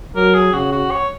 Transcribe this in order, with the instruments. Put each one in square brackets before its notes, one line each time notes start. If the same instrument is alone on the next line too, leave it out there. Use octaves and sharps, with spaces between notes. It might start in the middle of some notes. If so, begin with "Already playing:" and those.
[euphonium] F#3 [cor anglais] A#4
[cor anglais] G#4
[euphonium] C#3 [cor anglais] F#4
[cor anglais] F#4
C#5